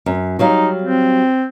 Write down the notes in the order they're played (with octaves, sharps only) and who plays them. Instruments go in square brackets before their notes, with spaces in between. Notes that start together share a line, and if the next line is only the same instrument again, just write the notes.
[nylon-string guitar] F#2
[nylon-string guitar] F#3 G3 F5 [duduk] D#4
[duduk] C4